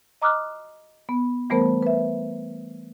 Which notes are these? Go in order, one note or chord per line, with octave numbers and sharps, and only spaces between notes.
D#5 A#5 D6 D#6 F6 F#6
B3
E3 G3 A3 B3 A#4 C5
B4 E5